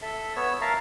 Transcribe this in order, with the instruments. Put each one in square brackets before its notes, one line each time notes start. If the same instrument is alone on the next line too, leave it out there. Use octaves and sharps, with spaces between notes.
[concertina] A4 E5
B3 C#5 E6
A#4 E5 F5 A5 A#5